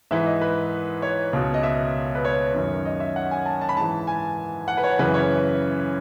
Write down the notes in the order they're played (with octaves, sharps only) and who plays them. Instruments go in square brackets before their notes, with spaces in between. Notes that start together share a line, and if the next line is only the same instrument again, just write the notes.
[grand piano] G#2 E3 E5
D#5
B4
C#5
C#2 B2
D#5
E5
B4
C#5
F#2 D#3
D#5
E5
F#5
G#5
A5
A5
B5
G#2 E3 A5
G#5
F#5
B4
C#5
F#2 C#3 E3 B4
C#5